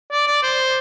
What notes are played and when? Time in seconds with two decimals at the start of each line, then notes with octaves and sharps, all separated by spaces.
0.12 D5
0.28 D5
0.43 C5